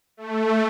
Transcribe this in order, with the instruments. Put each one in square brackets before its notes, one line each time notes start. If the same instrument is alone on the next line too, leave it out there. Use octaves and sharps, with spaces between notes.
[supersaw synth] A3